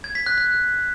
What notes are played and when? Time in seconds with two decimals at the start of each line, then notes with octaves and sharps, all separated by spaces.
0.04 G#6
0.15 B6
0.26 F#6
0.38 F#6